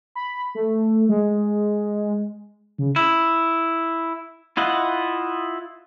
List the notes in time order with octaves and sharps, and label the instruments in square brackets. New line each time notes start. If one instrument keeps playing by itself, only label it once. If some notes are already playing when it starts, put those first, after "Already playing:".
[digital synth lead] B5
A3
G#3
C#3
[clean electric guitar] E4
[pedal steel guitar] E4 F4 D#5 F#5